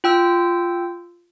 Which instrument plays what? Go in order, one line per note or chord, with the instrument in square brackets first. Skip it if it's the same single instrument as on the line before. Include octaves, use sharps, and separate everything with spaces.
[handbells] F4 G5 E6